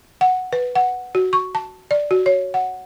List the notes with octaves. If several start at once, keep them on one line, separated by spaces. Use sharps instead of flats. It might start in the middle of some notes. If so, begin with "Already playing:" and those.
F#5
B4
F#5
F#4
C#6
A5
D5
F#4
C#5
F#5